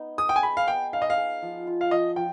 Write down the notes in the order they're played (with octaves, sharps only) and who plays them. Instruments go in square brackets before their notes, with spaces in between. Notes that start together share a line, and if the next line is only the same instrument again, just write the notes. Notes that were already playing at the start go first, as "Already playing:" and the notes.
Already playing: [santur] B3 D#4
[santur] G#4 [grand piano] D#6
[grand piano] G5
G#5
[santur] G#4 [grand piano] B5
[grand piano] F5
[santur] B3 [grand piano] G5
[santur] D#4 [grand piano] F5
[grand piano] D#5
F5
[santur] G#4
F3
F4
[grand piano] F5
[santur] F3 [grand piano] D#5
[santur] F3 [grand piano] G5